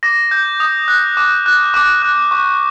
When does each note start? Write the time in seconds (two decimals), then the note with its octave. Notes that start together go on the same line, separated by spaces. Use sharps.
0.03 D6 A#6
0.31 G6
0.60 D#6
0.88 F#6
1.17 D6
1.46 F#6
1.74 D6
2.02 F#6
2.31 C#6